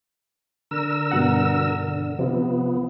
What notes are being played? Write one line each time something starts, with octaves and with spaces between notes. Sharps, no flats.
D3 A#4 E6
G2 B2 F#5
D3
C3 F3 B3